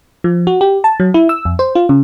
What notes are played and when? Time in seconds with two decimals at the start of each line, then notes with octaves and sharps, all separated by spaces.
0.24 F3
0.47 F#4
0.61 G4
0.84 A5
1.00 F#3
1.14 E4
1.29 E6
1.45 F2
1.59 C5
1.75 F4
1.89 C#3